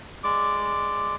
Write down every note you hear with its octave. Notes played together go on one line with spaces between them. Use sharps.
G#3 D5 D6